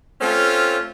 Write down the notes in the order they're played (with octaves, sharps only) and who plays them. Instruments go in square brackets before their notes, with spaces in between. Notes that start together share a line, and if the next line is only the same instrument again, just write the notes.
[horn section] A3 C4 C#4 F4